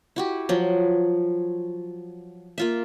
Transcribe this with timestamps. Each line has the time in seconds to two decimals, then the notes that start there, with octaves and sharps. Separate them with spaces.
0.16 E4 F#4 G4
0.49 F3 F#3
2.58 A#3 F4 E5